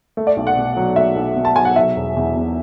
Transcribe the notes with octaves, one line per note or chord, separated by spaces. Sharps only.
A3
D5
B1
F#5
B2
F#3
A3 E5
B1
B2
A5
F#3 G#5
F#5
F#3 E5
E1
E2
B2